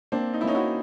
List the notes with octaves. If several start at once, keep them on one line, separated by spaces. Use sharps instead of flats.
A#3 C4 D4
D#4
E4
A#3 C#4 D#4
E4 F#4